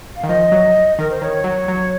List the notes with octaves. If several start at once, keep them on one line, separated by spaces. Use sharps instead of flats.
F5
D#3
F3 D#5
F#3
D#3 A#4
C5
D#3 C#5
F#3
F#3